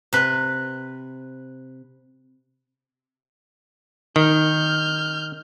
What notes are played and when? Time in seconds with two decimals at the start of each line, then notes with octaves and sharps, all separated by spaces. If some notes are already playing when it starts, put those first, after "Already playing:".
0.13 C3 B4
4.16 D#3 F6 G6